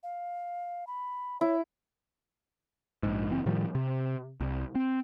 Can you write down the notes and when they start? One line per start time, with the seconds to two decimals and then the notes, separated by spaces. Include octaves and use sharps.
0.03 F5
0.87 B5
1.41 E4 C#5
3.03 A#1 G#2
3.29 F#1 E3 C4
3.46 A2 D#3 F3 G3
3.75 C3
4.41 C2
4.75 C4